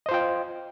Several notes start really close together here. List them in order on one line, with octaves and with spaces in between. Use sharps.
D#5 C5 F4 G5